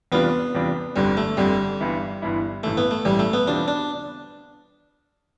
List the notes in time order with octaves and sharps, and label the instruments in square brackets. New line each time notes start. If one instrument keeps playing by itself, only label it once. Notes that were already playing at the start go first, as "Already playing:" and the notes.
[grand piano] E2 C3 G3 D4 F4 [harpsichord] B3
[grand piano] E2 C3 G3 D4 F4
[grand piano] G1 F2 D3 [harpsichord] G3
[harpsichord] A3
[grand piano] G1 F2 D3 [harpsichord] G3
[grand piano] G1 G2 E3 B3 E4
G1 G2 E3 B3 E4
[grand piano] A1 G2 E3 [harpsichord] A3
[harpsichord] B3
A3
[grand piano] A1 G2 E3 [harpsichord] G3
[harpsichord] A3
B3
[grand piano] E2 B2 G3 C4 F4 [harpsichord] D4
[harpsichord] D4